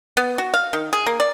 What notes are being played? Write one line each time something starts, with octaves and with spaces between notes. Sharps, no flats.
B3
F#4
F5
D#3
G#4
A#3
D5